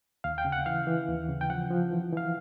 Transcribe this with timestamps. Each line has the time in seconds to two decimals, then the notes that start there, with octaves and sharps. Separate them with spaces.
0.24 D#2 F5
0.38 G5
0.45 C#3
0.52 F#5
0.66 E3 F5
0.87 E3
1.08 D#2
1.29 C#3
1.41 G5
1.50 F3 F#5
1.71 F3
1.91 E3
2.13 E3 F5